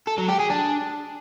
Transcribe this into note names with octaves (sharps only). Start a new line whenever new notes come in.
A4
F#3
G4
G#4
D4